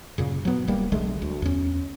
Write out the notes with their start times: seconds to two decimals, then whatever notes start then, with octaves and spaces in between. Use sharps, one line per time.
0.18 F#2 A#2 C#3
0.45 F#3 B3
0.68 D1 G3 A#3
0.92 B1 D3 G#3 A3
1.22 D2
1.42 E2 C#4